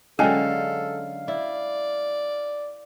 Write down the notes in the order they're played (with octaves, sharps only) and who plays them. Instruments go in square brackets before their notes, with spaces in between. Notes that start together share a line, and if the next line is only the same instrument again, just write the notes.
[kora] D3 F#3 G#3 [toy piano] C#4 G#5 [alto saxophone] A4 [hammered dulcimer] F5
[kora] E4 [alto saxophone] D5